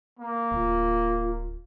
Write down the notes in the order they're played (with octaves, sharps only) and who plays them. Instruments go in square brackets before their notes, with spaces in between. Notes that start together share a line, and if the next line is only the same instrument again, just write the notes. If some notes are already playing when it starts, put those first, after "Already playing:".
[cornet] A#3
[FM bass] D1 [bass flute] F4